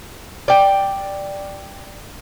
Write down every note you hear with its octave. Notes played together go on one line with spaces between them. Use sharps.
D5 G5